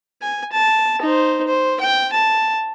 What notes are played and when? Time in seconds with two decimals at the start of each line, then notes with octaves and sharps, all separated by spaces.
0.22 G#5
0.52 A5
1.02 D#4 C5
1.47 C5
1.81 G5
2.13 A5